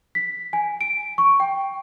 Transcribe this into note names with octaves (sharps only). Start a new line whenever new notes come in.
B6
G#5
D7
C#6
G5